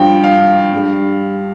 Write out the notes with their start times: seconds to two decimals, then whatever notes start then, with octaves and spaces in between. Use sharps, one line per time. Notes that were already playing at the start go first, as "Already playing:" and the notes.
Already playing: G2 F3 G5
0.24 F5
0.73 G2 G3